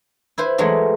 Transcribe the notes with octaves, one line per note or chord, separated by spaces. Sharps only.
E4 B4 C5
E3 F#3 G#3 A3